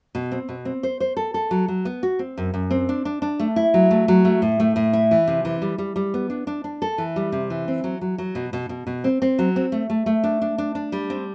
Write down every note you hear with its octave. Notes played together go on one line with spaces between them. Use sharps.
B2
C4
B2
C4
C5
C5
A4
A4
F#3
F#3
B3
F#4
C4
F#2
F#2
C4
D4
D4
D4
A3
E4
F#3
A3
F#3
A3
A2
A3
A2
E4
E3
C3
E3
G3
G3
G3
B3
D4
D4
D4
A4
E3
G3
C3
E3
C4
F#3
F#3
F#3
B2
B2
B2
B2
C4
C4
F#3
C4
A3
A3
A3
D4
D4
D4
D4
G3
C4